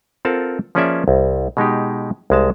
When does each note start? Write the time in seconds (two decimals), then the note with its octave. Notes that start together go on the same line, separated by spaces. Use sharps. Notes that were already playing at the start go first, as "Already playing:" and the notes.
0.25 C4 F4 A4 A#4 F#5 A5
0.75 F3 A#3 C#4 G#4 D5 E5
1.08 C2
1.57 B2 G#3 D#4 G4
2.30 C2 G#3 A5